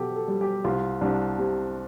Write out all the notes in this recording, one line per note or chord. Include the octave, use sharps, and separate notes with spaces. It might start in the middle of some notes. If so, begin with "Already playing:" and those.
Already playing: B2 G4 A4
A4
G3
G4
C2 F4
C2 D4
C3